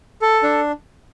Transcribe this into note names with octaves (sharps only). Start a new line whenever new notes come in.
A4
D4